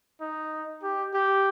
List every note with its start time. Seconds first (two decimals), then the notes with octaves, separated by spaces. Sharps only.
0.21 D#4
0.83 G4
1.14 G4